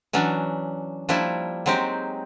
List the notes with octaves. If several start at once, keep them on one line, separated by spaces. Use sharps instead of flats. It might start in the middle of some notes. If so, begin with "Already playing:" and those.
E3 F#3 C#4 D4
F3 G3 A#3 D4 E4
F#3 G#3 C4 D#4 G4